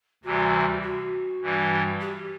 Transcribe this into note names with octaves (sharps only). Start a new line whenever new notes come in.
D2 C3 E3 G3 F#4
F#4
G2 E3 G3
G4